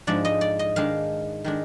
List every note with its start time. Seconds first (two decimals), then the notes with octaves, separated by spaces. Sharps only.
0.07 G#2 F3 G#3 D4 D5
0.25 D#5
0.41 D5
0.59 D#5
0.76 D#3 G#3 D4 F5
1.44 D#3 G#3 D4